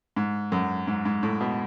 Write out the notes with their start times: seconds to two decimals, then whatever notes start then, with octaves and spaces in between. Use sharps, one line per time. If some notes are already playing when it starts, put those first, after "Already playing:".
0.16 G#2
0.52 F#2
0.87 G#2
1.05 G#2
1.23 A2
1.40 B2